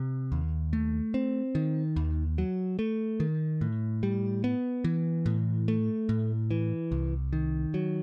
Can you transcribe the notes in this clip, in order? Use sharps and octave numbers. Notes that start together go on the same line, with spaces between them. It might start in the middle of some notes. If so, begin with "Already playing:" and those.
Already playing: C3
D#2
A3
C4
D#3
D#2
F#3
A3
D#3
A2
G3
B3
E3
A2
A3
A2
E3
C2
D#3
F#3